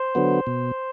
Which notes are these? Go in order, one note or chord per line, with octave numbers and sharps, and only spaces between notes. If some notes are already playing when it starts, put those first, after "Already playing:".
Already playing: C5
D3 F#3 B3
B2